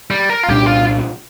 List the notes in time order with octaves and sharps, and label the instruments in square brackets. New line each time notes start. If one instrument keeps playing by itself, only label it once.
[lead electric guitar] G3
A#4
F4
[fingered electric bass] C2 A#2 G3 D4 [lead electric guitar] G4
[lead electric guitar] F4